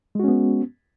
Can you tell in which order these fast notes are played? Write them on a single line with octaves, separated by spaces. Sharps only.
G#3 F#4 C#4 B3